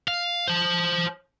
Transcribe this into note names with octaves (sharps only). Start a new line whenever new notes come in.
F5
C5 A5